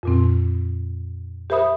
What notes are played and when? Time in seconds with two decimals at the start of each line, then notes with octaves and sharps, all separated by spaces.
0.03 F2 A#2 C4
1.50 G4 A#4 C5 E5 B5 D#6